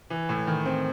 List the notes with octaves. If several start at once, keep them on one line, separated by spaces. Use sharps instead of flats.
E3
A2
D#3
C4